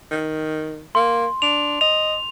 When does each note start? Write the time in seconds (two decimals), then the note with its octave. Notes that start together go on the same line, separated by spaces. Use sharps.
0.11 D#3
0.95 A#3 C6
1.42 D4 F7
1.81 D#5 F7